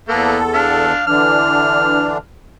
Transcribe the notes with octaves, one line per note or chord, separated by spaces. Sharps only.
E2 A#3 B3 A4
D4 F5
D3 E3 D4 F6